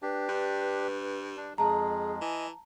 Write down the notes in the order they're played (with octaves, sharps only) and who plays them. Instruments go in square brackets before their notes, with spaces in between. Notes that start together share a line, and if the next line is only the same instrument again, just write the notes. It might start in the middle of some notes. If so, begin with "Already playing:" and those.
[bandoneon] D4 G4 [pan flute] B4
[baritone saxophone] G2
[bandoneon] D4
[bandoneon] F2 G#3 [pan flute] G#4 [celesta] A5 A#5
[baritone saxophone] E3 [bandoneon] D#5 [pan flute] G#5